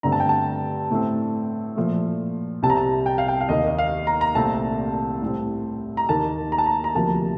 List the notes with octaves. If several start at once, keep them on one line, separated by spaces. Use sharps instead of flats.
G2 D3 A3 C4 A#5
A5
G5
A5
A2 A3 C4
A#2 F3 A3
C2 C3 G3 C4 A5
A#5
A5
G5
F5
G5
F5
D#2 D#3 A#3 D#5
D#5
F5
A#5
A#5
C2 A#2 A3 C4 A5
A2 G3 C4
A#5
D#2 D#3 A#3 A5
A#5
A5
A#5
A#5
D2 C3 F3 A#3 A5